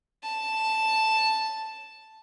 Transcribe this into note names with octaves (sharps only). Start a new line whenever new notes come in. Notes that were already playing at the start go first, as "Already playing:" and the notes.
A5